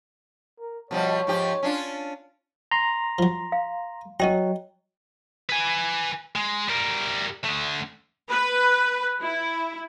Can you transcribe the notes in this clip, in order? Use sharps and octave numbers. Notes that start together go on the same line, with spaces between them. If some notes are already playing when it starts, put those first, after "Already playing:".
A#4
B2 F3 G3 C#5
G#2 F3 G4
C#4 D4 F4
A#5 C6
F3 F#3
F5
F#3 C#4 F#4 D#5 G5 A#5
B4 G#5
G#3
G3 A#4
D3 A3
B4
E4